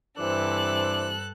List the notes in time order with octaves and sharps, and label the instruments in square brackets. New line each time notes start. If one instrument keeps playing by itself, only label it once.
[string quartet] G2 A4 F#6 [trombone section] C3 E3 [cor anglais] D4 [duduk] C5